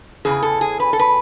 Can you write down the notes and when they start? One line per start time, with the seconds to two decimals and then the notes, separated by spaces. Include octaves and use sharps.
0.25 E2 C#3 E3 G#4
0.43 A4
0.61 G#4
0.80 B4
0.93 A4
0.99 B4